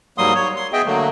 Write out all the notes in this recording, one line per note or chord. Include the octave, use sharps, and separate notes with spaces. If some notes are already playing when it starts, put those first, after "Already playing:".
G#2 F#3 G3 A#3 C6 D#6
C#5
C6
B3 G#4 D#5 E5 G5
D3 F#3 A3 A#3